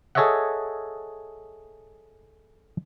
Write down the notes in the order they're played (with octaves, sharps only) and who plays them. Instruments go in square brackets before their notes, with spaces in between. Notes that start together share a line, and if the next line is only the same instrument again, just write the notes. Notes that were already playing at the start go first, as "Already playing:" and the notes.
[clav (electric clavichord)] G#4 A4 C#5 D#5 E5 F#5